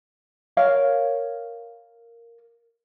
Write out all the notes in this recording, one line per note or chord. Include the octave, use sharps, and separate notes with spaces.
A#4 C#5 F5